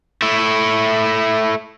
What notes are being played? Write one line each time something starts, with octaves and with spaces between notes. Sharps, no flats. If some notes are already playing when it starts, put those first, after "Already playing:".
A3 E4